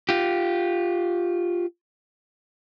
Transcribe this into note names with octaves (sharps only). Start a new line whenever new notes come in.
F4 G4